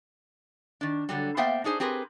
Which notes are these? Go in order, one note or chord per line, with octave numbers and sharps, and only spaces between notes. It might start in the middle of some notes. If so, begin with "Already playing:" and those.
D#3 D4
D3 F#3 G3
A#3 B3 C5 E5 F5 G5
D4 D#4 G#4 C5
C4 G4 G#4 A#4 B4